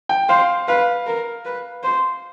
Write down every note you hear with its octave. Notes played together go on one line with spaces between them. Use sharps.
G5
C5 F5
B4 F5
A#4
B4
C5